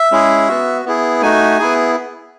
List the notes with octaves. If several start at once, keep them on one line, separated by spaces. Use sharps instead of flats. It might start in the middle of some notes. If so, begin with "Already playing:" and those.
Already playing: E5
G#3 C#4 E4 G#4
B3 F#4
B3 E4 G#4
A3 D#4 F#4 G#5
B3 E4 G#4